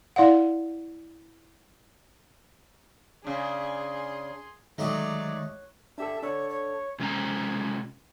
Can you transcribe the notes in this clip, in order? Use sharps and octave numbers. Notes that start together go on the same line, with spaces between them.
E4 D5 F5 F#5
C#3 D4 G#4 C6
D#3 F#3 G#3 A3 D#4 G4 D5
D4 G4 A4 E5
D4 A4 C#5
C#5
C3 G#3 C#4 C#5 A#5